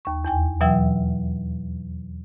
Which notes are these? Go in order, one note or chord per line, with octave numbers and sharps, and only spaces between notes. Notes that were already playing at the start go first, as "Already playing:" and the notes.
D#2 C#6
E2 G5 G#5
B2 E3 F#3 E5 G5 E6